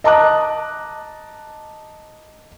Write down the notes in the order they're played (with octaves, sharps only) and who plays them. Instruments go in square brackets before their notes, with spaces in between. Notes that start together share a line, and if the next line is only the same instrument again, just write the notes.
[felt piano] D#5 A5 A#5 D6 D#6 F#6